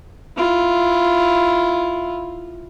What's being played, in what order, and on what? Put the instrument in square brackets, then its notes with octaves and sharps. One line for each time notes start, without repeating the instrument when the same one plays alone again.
[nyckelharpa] E4 F4